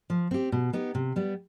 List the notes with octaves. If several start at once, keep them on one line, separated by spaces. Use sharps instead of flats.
F3
C4 G4
B2
B3 D#4 G4
C3
G3 B3